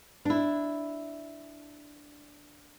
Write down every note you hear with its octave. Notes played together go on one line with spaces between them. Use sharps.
D4 E4